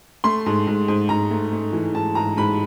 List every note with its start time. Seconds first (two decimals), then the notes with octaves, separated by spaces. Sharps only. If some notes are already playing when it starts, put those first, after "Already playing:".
0.24 A3 C6
0.46 G#2
0.67 G#2
0.88 G#2
1.09 G#2 A#5
1.31 A3
1.53 A3
1.73 E3
1.95 G#2 A5
2.15 G#2 A#5
2.37 G#2 B5